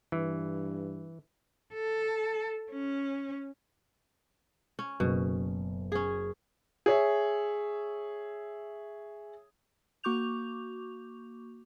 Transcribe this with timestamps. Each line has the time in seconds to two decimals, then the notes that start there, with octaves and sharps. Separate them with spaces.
0.12 G2 E3
1.73 A4
2.71 C#4
4.79 C#4
5.00 F#1 B2
5.92 C#4 G#4
6.86 G#4 C#5 E5
10.04 A#3 F#4 C#6 D6 G6 F7